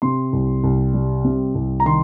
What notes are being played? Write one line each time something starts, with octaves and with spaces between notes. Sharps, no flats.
C3 C6
C2
C2
G3
C3
C2
A#5
D#3 C6